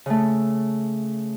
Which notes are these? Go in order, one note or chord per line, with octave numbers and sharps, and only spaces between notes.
C#3 A3